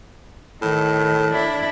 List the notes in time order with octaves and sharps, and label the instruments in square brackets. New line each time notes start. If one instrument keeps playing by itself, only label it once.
[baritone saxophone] A2 [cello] D#3
[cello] D4 E4